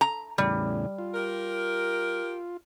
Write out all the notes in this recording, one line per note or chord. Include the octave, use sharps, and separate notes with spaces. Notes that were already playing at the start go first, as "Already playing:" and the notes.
A#5
E2 A2 C#3 G3
F4
G4 A#4